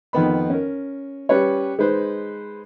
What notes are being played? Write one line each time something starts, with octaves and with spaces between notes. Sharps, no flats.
F2 D#3 B3 B5
C#4 A#4
G3 C#4 B4 C#5
G#3 D#4 B4 C5